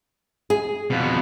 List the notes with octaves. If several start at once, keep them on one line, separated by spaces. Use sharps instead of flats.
G#4
F2 B2